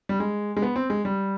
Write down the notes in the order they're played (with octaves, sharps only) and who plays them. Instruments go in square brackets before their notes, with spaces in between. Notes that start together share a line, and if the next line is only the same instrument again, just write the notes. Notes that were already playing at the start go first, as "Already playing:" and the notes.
[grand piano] G3
G#3
G#3
B3
C4
G#3
G3